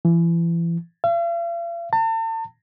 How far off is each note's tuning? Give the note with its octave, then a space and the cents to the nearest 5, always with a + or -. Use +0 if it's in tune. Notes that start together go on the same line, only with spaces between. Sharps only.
E3 +35
F5 -45
A5 +40